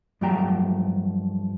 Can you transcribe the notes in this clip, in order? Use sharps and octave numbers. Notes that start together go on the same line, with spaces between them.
G2 F3 F#3 A3 G5 A#5